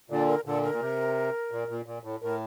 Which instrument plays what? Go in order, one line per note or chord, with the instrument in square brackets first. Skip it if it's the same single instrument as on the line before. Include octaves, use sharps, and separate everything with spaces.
[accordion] A#2 D3 [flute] D5
[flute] A#4
[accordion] A#2 D3 [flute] A4
[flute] A#4
[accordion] A#2
C3
A#2
A#2
A#2
A2
[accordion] A2 [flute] A#4